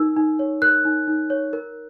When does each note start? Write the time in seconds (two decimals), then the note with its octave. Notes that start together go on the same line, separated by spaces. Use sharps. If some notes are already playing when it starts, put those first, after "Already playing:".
Already playing: D#4 A#4 E6
0.17 D#4
0.39 C#5
0.62 A#4 F#6
0.85 D#4
1.08 D#4
1.30 C#5
1.53 A#4